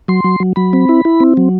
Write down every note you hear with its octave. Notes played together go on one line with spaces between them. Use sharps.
F#3 C6
F#3
F#3
F#3 B5
C4
E4
E4
C4
F#3